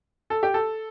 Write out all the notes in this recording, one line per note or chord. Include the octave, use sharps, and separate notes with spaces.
A4
G4
A4